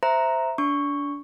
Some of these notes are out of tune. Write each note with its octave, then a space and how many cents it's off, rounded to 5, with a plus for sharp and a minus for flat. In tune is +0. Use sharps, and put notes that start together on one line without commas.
C5 -10 E5 +0 A#5 +0
D4 -25 C#6 +0